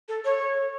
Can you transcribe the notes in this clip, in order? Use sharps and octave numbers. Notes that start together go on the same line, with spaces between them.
A4
C#5